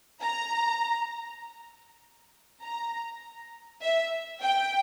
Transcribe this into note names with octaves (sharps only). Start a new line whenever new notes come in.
A#5
A#5
E5
G5